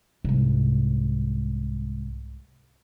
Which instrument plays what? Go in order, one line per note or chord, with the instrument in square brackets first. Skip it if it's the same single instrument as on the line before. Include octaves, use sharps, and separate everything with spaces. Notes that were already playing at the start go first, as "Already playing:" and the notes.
[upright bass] C2 G#2